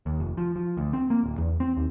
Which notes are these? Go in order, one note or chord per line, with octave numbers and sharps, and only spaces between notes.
D#2
F1
F3
F3
D2
C4
A#3
D1
E2
C4
D#2